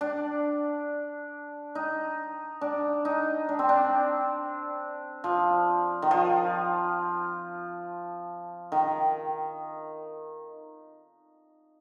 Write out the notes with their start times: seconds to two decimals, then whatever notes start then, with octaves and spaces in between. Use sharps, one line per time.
0.01 D4
1.75 D#4
2.61 D4
3.05 D#4
3.49 D4
3.59 C4
3.69 D4
5.24 F3
6.02 D#3
6.11 F3
8.72 D#3